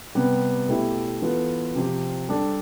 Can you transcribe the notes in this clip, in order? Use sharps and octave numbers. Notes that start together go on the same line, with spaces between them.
C3 G3 B3
B2 A3 E4 G4
E3 B3 F4 A4
C3 F3 C4 G4
G3 D4 A4